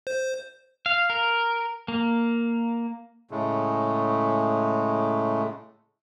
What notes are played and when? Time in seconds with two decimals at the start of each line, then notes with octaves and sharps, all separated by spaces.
0.07 C5
0.86 F5
1.10 A#4
1.88 A#3
3.31 A2 C#3 G#3 A3